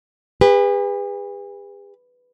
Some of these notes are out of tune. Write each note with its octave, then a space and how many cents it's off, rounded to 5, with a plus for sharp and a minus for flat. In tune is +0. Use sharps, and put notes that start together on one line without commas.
G#4 -45 B4 +0